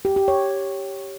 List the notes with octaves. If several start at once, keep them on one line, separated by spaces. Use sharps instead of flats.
G4
G4
C#5